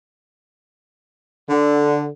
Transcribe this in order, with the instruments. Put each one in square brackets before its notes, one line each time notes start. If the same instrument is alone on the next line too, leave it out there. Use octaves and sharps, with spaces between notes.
[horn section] D3